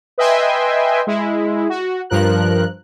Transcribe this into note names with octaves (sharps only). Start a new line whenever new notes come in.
B4 D#5 E5 G5 G#5 C6
G#3 E4
F#4
G2 F3 A#4 F#6